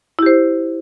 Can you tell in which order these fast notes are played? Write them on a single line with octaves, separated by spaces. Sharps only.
E4 G4 C5